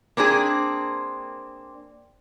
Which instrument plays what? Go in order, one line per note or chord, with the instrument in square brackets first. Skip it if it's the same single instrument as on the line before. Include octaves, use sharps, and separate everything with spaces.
[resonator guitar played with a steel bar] A#3 C4 D4 G#4